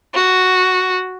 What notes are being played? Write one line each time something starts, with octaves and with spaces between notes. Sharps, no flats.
F#4